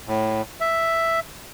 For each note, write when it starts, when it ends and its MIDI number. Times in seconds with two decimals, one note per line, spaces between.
0.08 0.42 45
0.61 1.20 76